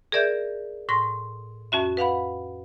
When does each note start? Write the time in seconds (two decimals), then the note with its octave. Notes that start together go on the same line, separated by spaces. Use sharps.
0.12 G#4 A#4 D5 E5 G6
0.89 A2 C6 A#6
1.72 F2 C#4 F#4 E5
1.97 B4 F5 F#5 B5